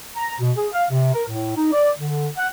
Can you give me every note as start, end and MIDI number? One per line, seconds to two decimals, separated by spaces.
0.16 0.35 82
0.40 0.52 47
0.57 0.68 68
0.73 0.84 77
0.90 1.10 48
1.14 1.23 70
1.28 1.55 45
1.56 1.72 63
1.72 1.90 74
1.98 2.29 50
2.37 2.48 78